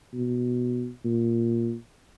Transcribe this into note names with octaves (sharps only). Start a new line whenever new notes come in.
B2
A#2